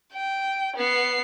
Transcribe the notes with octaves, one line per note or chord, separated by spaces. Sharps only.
G5
B3 C7